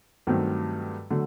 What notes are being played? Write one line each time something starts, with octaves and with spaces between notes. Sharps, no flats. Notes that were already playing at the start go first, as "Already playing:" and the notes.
G2 D#3 F#3 A3 C4
D3 F#3 A3